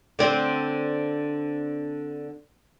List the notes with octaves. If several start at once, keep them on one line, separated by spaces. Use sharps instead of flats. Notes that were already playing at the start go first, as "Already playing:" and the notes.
D3 C4